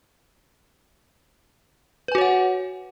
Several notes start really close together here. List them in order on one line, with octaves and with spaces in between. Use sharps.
B4 G#5 F#4 C#5 F#5